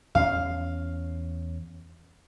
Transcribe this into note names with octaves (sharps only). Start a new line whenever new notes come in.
E2 C#4 F5